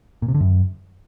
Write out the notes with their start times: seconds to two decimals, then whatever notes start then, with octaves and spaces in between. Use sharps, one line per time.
0.22 A#2
0.28 C3
0.34 D3
0.41 F#2